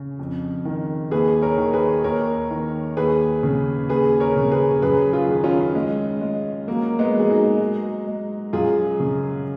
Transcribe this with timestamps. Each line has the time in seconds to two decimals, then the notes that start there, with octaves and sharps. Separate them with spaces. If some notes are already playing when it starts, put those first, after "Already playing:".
Already playing: C#3
0.19 F2
0.65 D#3
1.11 D#2 G#4 B4
1.42 A#4 C#5
1.58 D#3
1.73 G#4 B4
2.04 D#2 A#4 C#5
2.51 D#3
2.97 D#2 G#4 B4
3.43 C#3
3.89 D#2 G#4 B4
4.20 A#4 C#5
4.36 C#3
4.52 G#4 B4
4.82 F#2 G#4 B4
5.13 F4 G#4
5.28 D#3
5.44 C#4 F4
5.75 G#3
6.21 G#3
6.68 F#3 A#3
6.99 G#3 B3
7.14 F#3
7.19 G#4
7.30 D#4 F#4
7.60 G#3
8.07 G#3
8.53 F#2 F4 G#4
9.00 C#3